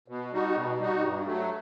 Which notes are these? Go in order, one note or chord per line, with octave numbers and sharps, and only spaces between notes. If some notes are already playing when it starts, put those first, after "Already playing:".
B2
G3 D#4 F#4
B2
G3 D#4 F#4
G2
F#3 A3